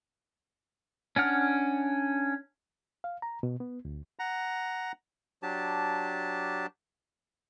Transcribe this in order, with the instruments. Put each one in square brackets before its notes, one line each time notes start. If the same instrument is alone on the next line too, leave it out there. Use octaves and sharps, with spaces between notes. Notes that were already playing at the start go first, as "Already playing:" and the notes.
[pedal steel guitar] C#4 D4 F#5 F6
[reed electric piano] F5
A#5
B2
B3
D2
[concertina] F#5 A#5
[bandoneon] F#3 D4 G4 A5